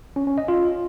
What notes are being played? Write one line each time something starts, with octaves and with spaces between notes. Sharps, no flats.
C#4
C#4
D#5
F4